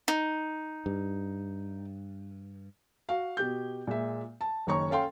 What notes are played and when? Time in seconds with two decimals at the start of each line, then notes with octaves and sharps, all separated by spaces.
0.08 D#4
0.86 G2
3.09 F#4 F5
3.37 B2 G4 G6
3.87 A#2 G#3 E5
4.41 A5
4.67 F#1 D#3 C#5 A#5 C#6
4.90 C#4 A4 F5 G5 C6